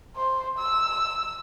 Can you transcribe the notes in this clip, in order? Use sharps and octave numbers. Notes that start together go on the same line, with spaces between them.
C5
E6